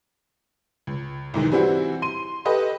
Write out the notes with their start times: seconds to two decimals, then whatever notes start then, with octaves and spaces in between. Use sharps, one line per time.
0.87 C#2
1.34 C2 G#2 D#3 E3
1.52 E3 G3 C4 E4 F#4
2.02 C6 D#7
2.45 G4 A4 B4 D#5